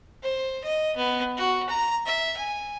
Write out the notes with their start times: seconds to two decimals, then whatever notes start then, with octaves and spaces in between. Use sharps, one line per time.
0.23 C5
0.64 D#5
0.96 B3
1.37 F#4
1.69 A#5
2.06 E5
2.37 G#5